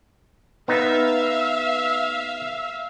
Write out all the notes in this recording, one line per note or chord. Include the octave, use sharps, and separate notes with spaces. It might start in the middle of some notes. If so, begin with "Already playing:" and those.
B3 D#4 B4 E5 F5